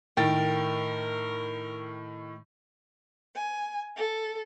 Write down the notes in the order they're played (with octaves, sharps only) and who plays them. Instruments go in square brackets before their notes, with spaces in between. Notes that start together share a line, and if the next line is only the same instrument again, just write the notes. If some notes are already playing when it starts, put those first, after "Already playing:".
[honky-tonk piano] A2 D#3 A6 [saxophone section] A#4 [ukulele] G5
[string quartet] G#5
A4